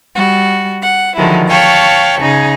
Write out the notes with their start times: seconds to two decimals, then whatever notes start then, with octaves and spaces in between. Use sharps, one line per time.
0.14 G3 F#4
0.81 F#5
1.15 D3 D#3 F3 F#3 G#3 E4
1.47 C#5 F5 G5 A5 B5 C#6
2.20 C#3 D#4 G#4